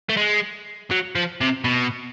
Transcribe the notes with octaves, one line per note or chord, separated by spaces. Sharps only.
A3
G#3
F#3
F3
C3
B2